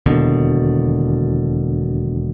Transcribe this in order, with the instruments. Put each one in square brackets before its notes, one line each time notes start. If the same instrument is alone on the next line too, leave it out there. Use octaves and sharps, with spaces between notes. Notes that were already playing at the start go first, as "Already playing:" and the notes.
[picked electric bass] E1 D#2 B2 D3